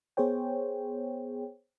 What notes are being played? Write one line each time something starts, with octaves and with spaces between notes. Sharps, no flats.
B3 G#4 C5 C#5 G5